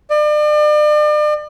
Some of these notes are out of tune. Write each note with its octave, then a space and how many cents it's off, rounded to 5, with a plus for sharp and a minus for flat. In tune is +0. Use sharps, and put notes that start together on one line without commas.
D5 +40